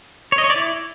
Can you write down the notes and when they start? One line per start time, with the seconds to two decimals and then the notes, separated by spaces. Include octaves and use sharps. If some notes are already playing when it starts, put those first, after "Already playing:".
0.32 C#5
0.38 D#5
0.44 C#5
0.50 D5
0.56 E4